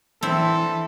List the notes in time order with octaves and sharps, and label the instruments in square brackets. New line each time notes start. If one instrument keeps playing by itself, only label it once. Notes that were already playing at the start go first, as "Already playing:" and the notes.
[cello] E3 [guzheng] C4 E4 [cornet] A4